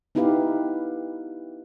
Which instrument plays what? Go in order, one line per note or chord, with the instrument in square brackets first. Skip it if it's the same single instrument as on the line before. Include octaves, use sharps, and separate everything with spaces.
[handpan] B3 D#4 E4 G4 B4 F5